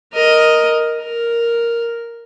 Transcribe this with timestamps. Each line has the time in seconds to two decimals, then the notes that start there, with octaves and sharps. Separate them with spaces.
0.13 A#4 D#5
1.00 A#4